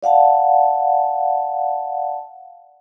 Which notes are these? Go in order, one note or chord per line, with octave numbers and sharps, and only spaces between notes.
D5 F5 F#5 A5